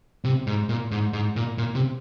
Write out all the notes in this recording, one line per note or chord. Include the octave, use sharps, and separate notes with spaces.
C3
G#2
A#2
G#2
G#2
A#2
A#2
C3